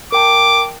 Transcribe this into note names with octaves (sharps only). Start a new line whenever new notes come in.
A#4 G5 A5 D6